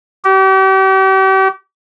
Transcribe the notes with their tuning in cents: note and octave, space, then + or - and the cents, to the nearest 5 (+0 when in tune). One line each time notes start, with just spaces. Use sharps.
G4 -40